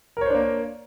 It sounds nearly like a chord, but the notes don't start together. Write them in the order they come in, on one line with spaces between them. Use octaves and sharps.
A#4 C#5 C5 D4 A#3